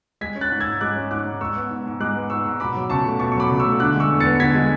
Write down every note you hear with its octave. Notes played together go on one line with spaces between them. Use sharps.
G#3 G#6 B6
C#4
F#6 A6
G#2
E6 G#6
G#2
G#3 D6 F#6
C#4
G#2 D6 F#6
G#2
G#3 C#6 E6
B3
G#2
G#2
G#3 D6 F#6
B3
G#2 C#6 E6
G#2
B2 B5 D6
F#3
C#2 A5 C#6
A3
B2 A5 C#6
C#6
F#3 B5 D6
C#2
C#6 E6
A3
D3 D6 F#6
G#3
C#6 E6
E2
B3 A6 C#7
D3 G#6 B6
G#3